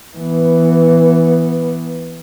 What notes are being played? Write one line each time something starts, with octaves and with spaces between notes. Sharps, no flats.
E3 B3